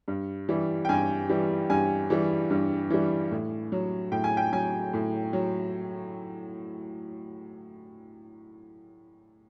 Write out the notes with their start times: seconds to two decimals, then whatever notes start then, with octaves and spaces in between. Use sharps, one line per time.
0.08 G2
0.49 E3 G3
0.85 G5
0.89 G2 G#5
1.29 E3 G3
1.70 G2 G#5
2.10 E3 G3
2.50 G2
2.90 E3 G3
3.31 A2
3.72 F#3
4.12 A2 G5
4.24 G#5
4.37 G5
4.53 F#3 G#5
4.93 A2
5.33 F#3